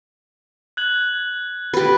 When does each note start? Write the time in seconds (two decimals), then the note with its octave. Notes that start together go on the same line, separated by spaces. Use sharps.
0.77 F#6 G#6 F#7
1.74 G4 B4 A6